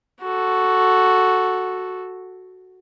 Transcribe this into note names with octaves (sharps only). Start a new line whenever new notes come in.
F#4 A4